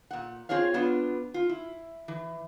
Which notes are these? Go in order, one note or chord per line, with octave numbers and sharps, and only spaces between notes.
A#2 F#5
C4 F4 G#4 C#5 F5
B3 D4 F4
F4
E4
E3